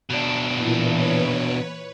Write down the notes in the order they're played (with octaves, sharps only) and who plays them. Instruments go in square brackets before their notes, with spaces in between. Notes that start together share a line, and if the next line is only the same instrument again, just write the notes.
[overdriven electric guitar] B2 D4
[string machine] A#2 E3
B4 C#5